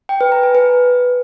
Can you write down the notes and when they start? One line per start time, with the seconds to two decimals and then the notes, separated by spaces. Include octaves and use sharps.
0.09 G5
0.21 B4
0.32 A#5
0.43 G#5
0.55 B4